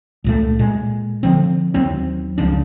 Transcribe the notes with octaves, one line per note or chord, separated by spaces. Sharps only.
C#2 A#2 A3
A#2 G#3
D3 F3 C4
D#2 F#3 C4
C#2 C#3 F3 D4